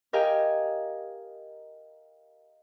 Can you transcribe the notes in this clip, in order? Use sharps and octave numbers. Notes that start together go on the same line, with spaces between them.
G4 A#4 D#5 F5 G5 G#5